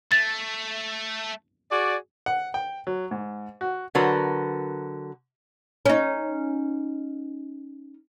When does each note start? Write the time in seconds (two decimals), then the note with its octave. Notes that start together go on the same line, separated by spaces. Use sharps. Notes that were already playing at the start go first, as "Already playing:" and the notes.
0.12 A3 A6
1.71 F#4 G#4 D5
2.26 F#5
2.54 G5
2.87 F#3
3.11 G#2
3.61 F#4
3.95 D3 F#3 F#4 A#4 B4
5.86 C#4 D#4